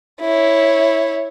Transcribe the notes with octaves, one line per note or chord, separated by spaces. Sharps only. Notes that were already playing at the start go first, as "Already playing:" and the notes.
E4 C#5